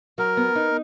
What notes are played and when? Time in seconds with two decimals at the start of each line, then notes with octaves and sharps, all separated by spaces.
0.18 F#3 A#4
0.37 B3
0.55 D#4